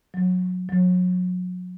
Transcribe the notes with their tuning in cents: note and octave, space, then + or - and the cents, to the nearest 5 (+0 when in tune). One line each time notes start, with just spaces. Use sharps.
F#3 -25
F#3 -35